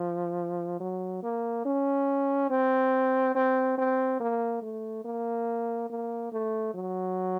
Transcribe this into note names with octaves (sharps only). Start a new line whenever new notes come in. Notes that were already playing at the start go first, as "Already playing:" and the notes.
Already playing: F3
F#3
A#3
C#4
C4
C4
C4
A#3
A3
A#3
A#3
A3
F#3